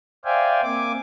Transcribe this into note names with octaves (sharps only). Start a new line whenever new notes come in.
C5 D5 E5 F5 G5 G#5
A#3 C4 G#5 D6